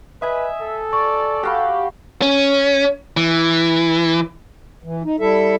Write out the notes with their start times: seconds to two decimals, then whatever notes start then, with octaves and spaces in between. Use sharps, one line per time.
0.22 B4 D#5 E5 G#5
0.62 A4
0.93 D5 C#6
1.43 F#4 G4 F5 B5
2.22 C#4
3.17 E3
4.84 E3
5.04 D#4
5.20 G3 E4 A4 E5